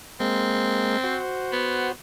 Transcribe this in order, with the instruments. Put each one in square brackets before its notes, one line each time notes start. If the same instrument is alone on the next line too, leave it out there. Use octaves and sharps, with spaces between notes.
[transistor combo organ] G#3 A#3 [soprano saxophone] C4
[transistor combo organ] F#4 C5
[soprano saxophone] B3